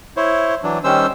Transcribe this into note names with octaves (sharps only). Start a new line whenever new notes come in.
E4 C5 C#5
E3 F#3 D4
D#3 G3 C#4 C5 E6